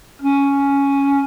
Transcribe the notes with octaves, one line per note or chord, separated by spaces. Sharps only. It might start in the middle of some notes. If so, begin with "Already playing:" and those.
C#4